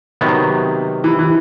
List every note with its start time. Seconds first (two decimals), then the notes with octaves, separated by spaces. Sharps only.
0.21 C3 D#3 F#3 B3
1.04 E3
1.19 E3